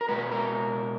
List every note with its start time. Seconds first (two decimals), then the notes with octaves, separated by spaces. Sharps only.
0.01 A#4
0.08 B2 G#3 B4
0.31 A#4